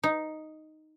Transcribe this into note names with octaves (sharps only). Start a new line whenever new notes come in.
D#4